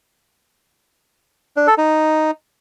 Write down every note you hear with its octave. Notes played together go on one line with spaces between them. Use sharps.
D4
A4
D#4